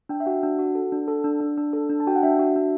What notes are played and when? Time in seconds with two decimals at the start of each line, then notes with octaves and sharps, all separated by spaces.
0.09 D4 G5
0.20 E5
0.26 F#4 F#5
0.43 D4
0.59 F#4
0.75 A4
0.92 D4
1.08 A4
1.24 D4
1.40 D4
1.57 D4
1.73 A4
1.90 D4
2.00 A5
2.07 F#4 G5
2.16 F#5
2.23 D4 E5
2.39 F#4
2.56 D4